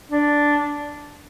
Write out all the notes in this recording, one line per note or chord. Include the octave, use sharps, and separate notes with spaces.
D4